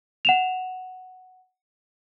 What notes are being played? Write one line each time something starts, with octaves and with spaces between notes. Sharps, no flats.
F#5 E7 F7